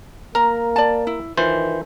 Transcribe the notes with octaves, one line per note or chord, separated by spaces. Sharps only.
A#3 A#4 A#5
D5 A5
E4
D#3 E3 F4 C5